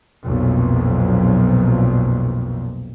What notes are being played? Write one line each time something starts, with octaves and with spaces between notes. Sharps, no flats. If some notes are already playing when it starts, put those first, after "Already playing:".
B1 F2 A#2